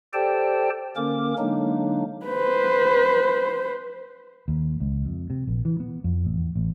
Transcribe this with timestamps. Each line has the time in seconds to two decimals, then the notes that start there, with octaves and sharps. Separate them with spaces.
0.13 G4 A4 C5 D5 G5 A5
0.96 D3 A#3 C#4 A#4 D6
1.39 D3 F#3 G#3 A#3 D4 D#4
2.26 B4 C5
4.48 D#2
4.80 C#2
5.05 F2
5.30 C3
5.47 A#1
5.65 E3
5.80 B3
6.04 F2
6.25 A1
6.37 E2
6.56 A1